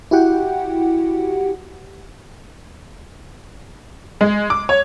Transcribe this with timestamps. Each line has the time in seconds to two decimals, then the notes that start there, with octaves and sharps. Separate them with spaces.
0.11 E4 F#4 G4 F#5 G5
4.21 G#3
4.50 D6
4.69 C#5